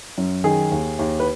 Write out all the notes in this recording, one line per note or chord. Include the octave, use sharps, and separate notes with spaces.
F#2
D#3 G#4
D#2
D#2
B4